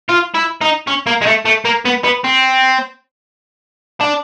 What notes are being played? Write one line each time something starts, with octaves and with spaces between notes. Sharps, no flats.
F4
E4
D#4
C#4
A#3
G#3
A3
A3
A#3
B3
B3
C4
D4